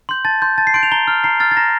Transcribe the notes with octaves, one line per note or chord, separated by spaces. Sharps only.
C6 G6
A5 A6
C6 G6
A5 A6
C7
C6 G6 D7
F7
A#5 G7
F6
A#5 C7
F6 A6
A6
A#5 A#6